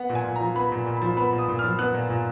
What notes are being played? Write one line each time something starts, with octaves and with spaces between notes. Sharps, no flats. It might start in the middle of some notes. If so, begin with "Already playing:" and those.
Already playing: B3 F#5
A#2
G#5
A#2
F3 A#5
B3 B5
A#2
A#2
F3 B5
B3 B5
A#2
D#6
A#2
F3 F6
B3 F#6
A#2
A#2